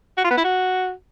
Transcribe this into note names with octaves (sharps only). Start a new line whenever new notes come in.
F#4
F4
B3
E4
F#4